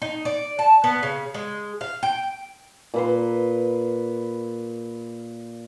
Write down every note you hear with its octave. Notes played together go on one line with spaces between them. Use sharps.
D#4
D5
A5
B3
C#3
G#3
F5
G5
A#2 B4 C6